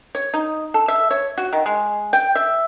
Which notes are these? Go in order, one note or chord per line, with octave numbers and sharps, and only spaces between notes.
C#5
D#4
A4
E5
C#5
F#4
D#3
G#3
G5
E5